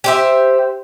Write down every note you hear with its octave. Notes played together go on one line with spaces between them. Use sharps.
G4 C5 E5